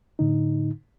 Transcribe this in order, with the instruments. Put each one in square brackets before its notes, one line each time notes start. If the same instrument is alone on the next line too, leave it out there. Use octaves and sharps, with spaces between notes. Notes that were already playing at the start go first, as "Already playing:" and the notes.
[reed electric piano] A2 D3 D#4